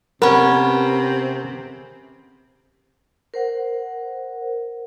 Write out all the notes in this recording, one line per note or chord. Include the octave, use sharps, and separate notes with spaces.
C3 B3 C#4 A#4
A#4 C5 F#5